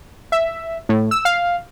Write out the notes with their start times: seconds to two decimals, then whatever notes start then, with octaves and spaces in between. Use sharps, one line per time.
0.32 E5
0.89 A2
1.11 E6
1.25 F5